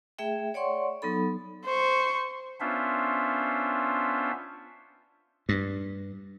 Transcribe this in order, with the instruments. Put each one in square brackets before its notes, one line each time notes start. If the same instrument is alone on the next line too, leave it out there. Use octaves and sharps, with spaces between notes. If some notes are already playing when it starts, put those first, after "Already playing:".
[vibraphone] A3 G#4 E5 G5
C#5 D5 F#5 C6 C#6
F#3 B3 D#4 A4 B5
[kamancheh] C5 C#6
[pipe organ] B3 C#4 D4 F4 C5 E5
[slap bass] G2